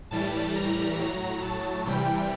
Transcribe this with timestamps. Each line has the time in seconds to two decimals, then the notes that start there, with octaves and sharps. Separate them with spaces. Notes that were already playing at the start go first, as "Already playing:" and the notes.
0.11 A2 E3 G3 A5
0.55 A#5
0.98 A2 F#3 A#5
1.42 A5
1.86 C3 E3 G3 G5